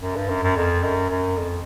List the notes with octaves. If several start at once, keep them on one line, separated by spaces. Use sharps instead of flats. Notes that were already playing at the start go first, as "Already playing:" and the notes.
F#2
G2
F#2
F#2
F2
F#2
F#2
F2